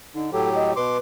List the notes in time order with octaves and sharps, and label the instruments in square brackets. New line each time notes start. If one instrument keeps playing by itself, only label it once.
[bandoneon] D3 [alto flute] D#4
[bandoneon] A2 F#3 G4 [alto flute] A4
[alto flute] D#5
[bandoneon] B2 C6 D6 [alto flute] B4